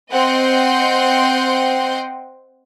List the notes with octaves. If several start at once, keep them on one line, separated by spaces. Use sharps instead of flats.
C4 D#5 F#5 G5 C6 G6